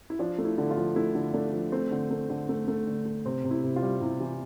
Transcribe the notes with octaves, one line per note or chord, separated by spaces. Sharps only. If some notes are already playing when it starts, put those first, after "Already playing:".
E4
F3 D4
A3
E4
D3
F4
F3
A3 E4
D3
A3 D4
F3
A3 C4
D3
A3
D3
A3
A3
D3
A3
C3 C4
C3
E4
C3
F4
G3
C3 E4
E3